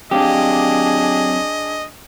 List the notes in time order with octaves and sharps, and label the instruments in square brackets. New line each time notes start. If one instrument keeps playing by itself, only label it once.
[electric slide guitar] F#3 C4 F5 [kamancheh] D4 G#4 [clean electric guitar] G4 [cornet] D#5